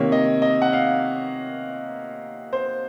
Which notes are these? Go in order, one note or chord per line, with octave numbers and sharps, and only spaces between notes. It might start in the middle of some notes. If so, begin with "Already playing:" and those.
Already playing: C3 D#3 A#3 C#5
D#5
D#5
F#5
F5
C5